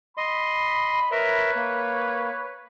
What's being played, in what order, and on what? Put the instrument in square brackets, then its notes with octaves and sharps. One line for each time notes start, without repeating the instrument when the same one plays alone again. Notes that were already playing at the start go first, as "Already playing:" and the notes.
[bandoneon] D#5 C6 [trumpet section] B5
[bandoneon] A#4 E5 [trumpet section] B4 C#5
[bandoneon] A#3